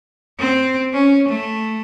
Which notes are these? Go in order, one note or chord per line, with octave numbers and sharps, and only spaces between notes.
C4
C#4
A3